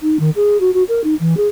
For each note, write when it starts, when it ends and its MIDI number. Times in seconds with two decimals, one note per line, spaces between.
0.02 0.17 63
0.19 0.30 51
0.36 0.59 68
0.60 0.70 66
0.73 0.83 66
0.88 1.03 70
1.04 1.14 63
1.20 1.37 52
1.37 1.48 68